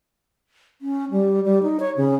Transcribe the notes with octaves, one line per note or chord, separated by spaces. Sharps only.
C#4
G3
G3
D#4
C#5
C#3